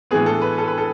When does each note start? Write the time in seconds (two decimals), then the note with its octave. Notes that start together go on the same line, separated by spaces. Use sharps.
0.11 A2 E3 G#3 B3 G#4
0.26 A4
0.42 B4
0.58 A4
0.68 B4
0.78 A4